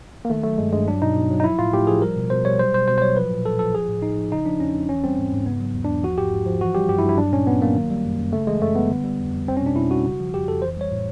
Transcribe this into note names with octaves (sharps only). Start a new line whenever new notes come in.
A#3
D#3 A3
F#3 A3
G2 G#3
G2 G#3
F#3 D4
B2 D#4
B2
F#3
D#4
F3 E4
A2 F4
A2 G4
F3 G#4
G3 A#4
B2
B2 C5
G3 C#5
F#3 C5
B2 C5
B2 C5
C5
F#3 C#5
F3 B4
A#2
A#2 A4
F3 A4
F3 G#4
A2
A2 D#4
F3
C#3 D#4
F3 D4
E2 C#4
E2
E3 C#4
G3 C4
G#2
G#2
C#3 B3
F#3
E2
D4
E2
F3 F#4
G#2 G4
G#2
F3
E3 F#4
G3 G4
G2 G4
E4
G2
E4
F#3 D4
A#2 C#4
A#2 B3
F#3 A#3
D#3
G3
F#2
F#2
C#3 A3
E3 G#3
F#2 A3
G3 B3
D3
G3
F2
F2
G3 C4
C#4
B2 D4
B2 E4
G3 F#4
C#3
F3
F2 G4
F2 A4
E3 C5
G3 C#5
A2